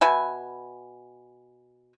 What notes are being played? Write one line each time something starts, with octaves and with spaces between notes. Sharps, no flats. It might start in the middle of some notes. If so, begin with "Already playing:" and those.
B2 B4 E5 G#5